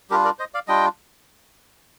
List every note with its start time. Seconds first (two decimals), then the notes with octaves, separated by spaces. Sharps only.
0.10 G3 D4 F4 G4 A#4
0.25 A#4 D5
0.39 C5 D#5
0.54 D5 F5
0.68 G3 D4 F4 D#5 G5